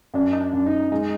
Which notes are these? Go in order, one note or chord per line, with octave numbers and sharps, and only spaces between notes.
F#2 D4
D#4
D4
F#2
D#4
G#3 D#4